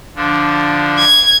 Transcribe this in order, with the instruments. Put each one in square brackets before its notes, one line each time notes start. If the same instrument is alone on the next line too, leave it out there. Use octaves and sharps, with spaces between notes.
[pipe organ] D3 F3 D4
[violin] G#6